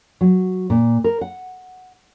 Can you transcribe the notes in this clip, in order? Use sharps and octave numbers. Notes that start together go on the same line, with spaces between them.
F#3
A#2
A#4
F#5